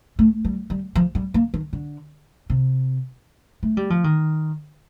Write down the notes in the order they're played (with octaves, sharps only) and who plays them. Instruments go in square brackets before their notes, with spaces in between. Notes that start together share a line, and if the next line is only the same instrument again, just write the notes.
[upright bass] A3
G3
G3
F3
G3
A#3
D#3
D3
C3
A3
G3
F3
D#3